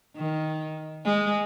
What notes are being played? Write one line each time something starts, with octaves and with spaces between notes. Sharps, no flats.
D#3
G#3